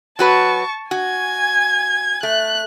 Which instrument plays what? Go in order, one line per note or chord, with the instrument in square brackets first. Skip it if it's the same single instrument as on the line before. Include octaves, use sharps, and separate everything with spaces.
[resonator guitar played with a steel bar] F#3 F#4 B4 [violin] A5 C#6
[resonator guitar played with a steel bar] F#4 [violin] G#5 G#6
[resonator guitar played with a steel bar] A3 [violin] F#6